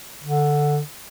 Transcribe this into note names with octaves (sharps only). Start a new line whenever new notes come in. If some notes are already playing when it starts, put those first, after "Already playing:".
D3